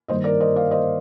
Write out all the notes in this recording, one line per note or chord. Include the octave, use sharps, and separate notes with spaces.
G2 D#3 A#3 C5 D#5
A#4 D5
C5 D#5
D5 F5
C5 D#5